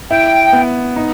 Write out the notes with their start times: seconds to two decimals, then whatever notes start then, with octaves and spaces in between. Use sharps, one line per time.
0.10 E4 G5
0.53 B3
0.96 D#4